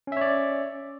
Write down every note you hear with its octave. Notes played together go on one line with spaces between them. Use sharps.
C#4 C#5 D5 E5